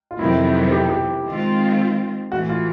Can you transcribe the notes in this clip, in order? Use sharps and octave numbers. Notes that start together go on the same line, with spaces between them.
F4
F2 C3 D#3 F#3 B3 E4
G4
G4
D#3 G#3 C4 F4
A2 E3 A3 F#4
F4